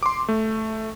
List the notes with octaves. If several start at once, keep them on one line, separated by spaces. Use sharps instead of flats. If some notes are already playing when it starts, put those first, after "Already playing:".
C6 D6
A3